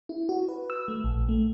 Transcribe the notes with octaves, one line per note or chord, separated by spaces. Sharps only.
E4
F#4
B4
E6
A3
A#1
A3